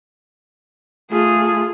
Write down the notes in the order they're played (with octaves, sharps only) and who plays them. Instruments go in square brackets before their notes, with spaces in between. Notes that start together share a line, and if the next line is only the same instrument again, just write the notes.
[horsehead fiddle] A3 F4 [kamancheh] G#4